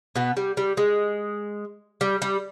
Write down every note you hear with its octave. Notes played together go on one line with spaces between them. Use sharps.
B2 B3
G3
G3
G#3
G3
G3